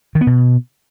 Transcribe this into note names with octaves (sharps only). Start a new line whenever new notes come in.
D#3
B3
B2